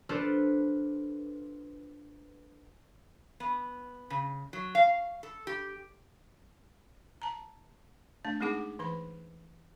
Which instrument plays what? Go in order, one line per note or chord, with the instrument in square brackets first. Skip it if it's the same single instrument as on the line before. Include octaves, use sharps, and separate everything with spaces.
[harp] D4 F4 A4 B4 C5
[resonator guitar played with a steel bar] B3
C#3
F#3
F5
A4
G4
[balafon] A5 A#5
A3 D4 A5
G#3 C4 D#4 G#4 F#5 D6
E3 B4 B5